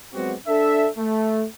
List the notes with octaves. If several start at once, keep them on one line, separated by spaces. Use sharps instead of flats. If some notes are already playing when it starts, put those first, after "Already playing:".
F#3 G#3 B3 C4 F#4 G4
D4 A4 E5
A3